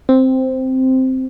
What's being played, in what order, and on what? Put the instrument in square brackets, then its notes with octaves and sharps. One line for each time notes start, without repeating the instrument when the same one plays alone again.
[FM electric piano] C4